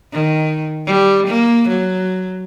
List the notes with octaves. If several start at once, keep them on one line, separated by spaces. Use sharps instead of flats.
D#3
G3
A#3
F#3